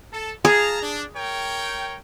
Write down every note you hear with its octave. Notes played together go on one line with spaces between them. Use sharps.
A4 A5
G#4 F5 A5 A#5
D4
A#4 C#5 G5